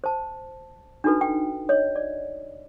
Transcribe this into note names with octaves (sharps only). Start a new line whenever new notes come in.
C5 A5
D4 D#4 F#4 A4 B4
G5
C#5 D#5
D5